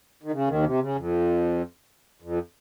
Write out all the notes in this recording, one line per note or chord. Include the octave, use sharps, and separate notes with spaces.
D#3
C#3
D#2 D#3
C3
C#3
F2
F2